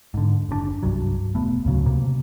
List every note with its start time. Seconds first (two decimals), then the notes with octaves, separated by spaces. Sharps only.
0.14 G#2 D3
0.49 F#1 C3 D4
0.83 C2 G2 F#3
1.34 E1 A3 B3
1.65 D2 A2 C#3 F#3
1.86 C3 A#3